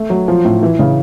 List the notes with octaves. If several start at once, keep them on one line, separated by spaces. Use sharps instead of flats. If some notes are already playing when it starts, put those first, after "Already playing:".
Already playing: A3
F#3
F3
A2
E3
C#3